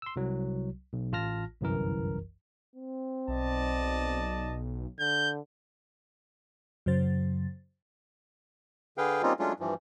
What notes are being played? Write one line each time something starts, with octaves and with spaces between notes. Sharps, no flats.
C6 E6
C2 F#3
B1
A1 F4 A5 F6 A#6
G1 C2 F#2 E3 A#4
C4
B1 D5 D#5 A5
D3 G6
F#2 C#3 F#3 C5 A6
D3 G#4 B4 F5 G5
G3 A#3 C4 C#4 D#4 F4
F#3 G#3 A3 C#4 D4 F4
G2 E3 F3